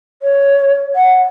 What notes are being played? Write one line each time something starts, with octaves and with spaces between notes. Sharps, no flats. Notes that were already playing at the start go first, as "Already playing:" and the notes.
C#5
F#5